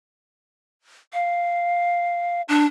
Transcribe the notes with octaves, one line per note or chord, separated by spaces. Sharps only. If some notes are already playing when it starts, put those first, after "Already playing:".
F5
D4